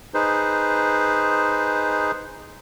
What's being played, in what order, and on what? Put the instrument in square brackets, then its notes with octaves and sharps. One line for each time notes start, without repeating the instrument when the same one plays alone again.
[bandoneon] D#4 G#4 B4 C5